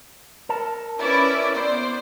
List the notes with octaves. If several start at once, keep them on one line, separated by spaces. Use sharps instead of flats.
A#4 A5
C#4 E4 B4 D5
B3 C5 D5